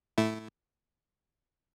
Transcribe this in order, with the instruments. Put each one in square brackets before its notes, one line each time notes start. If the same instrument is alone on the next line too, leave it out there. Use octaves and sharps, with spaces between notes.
[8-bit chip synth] A2 A3 E4